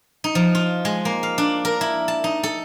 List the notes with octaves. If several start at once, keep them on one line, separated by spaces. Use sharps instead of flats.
D#4
F3
F4
G#3
A#3
F5
D4
A#4
E4
A5
D#4
A4